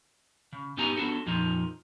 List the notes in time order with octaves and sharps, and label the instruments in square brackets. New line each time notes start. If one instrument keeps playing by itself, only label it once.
[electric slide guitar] C#3
G2 B3 D#4 G4 G#5 A#5
B3 D4 F#4 A4
F2 A#2 F3 D#4